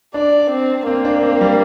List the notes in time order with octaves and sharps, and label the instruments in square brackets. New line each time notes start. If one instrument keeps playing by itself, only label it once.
[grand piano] D4 [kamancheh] D5
[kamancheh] C4
[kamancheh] A#3 [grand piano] C4
[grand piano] D4
C4
G3